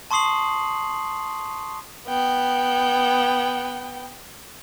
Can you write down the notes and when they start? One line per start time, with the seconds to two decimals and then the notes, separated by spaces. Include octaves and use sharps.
0.11 A5 C6 C#6 D#6 C7 F#7
2.07 B3 G5